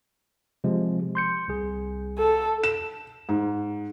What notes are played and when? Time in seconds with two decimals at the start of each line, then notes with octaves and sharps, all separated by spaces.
0.64 C3 F3 G#3
1.15 C6 G6 C#7
1.48 C2 G#4
2.18 A4
2.64 E7
3.29 G#2